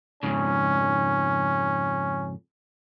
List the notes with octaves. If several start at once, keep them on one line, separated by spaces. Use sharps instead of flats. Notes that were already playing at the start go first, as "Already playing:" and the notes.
F2 G#2 C#3 C#4